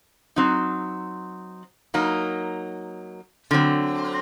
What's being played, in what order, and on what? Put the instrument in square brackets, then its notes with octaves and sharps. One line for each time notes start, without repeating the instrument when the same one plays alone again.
[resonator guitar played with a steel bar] F#3 C4 D#4
F#3 A#3 D#4
D3 F#3 C4